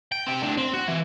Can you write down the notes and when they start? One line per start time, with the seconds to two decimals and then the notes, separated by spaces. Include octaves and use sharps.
0.12 G5
0.26 C4 G4
0.42 A2 D4
0.57 C4
0.73 F#4
0.88 E3